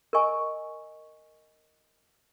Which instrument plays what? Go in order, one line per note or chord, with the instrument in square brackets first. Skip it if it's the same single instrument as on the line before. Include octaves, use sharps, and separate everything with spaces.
[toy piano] A#4 D#5 G#5 C#6